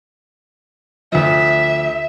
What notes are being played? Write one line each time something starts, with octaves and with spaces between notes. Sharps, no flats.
D2 F3 E5